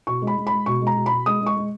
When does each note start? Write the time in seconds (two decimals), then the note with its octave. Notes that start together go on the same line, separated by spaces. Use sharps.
0.07 B2 C#6
0.22 G#3
0.27 B5
0.37 G#3
0.47 B5
0.52 G#3
0.66 B2 C#6
0.81 G#3
0.87 A#5
0.96 B2
1.06 B5
1.12 B2
1.26 G#3 D#6
1.41 G#3
1.46 C#6
1.57 G#3